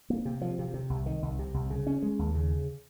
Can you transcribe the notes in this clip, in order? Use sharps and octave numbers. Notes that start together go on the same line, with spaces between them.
A#3
C3
F3
C3
C3
C2
D#3
C2
C3
C2
C#3
C#4
G#3
D#2
C#3